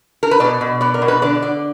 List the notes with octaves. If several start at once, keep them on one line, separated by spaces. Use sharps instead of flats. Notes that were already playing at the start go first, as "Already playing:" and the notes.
A#4
B4
B2 D5
B2
B3 D5
A#4
B2
B4
D3 D5
D3 D5